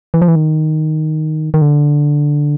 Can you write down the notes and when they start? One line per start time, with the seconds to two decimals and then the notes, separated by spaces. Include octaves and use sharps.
0.14 E3
0.22 F3
0.28 E3
0.36 D#3
1.54 D#3
1.62 D3